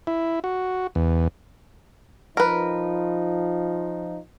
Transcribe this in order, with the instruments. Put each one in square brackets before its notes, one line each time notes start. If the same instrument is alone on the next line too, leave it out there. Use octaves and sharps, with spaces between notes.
[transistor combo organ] E4
F#4
E2
[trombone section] F3 D#4 F4 [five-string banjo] A#4 B4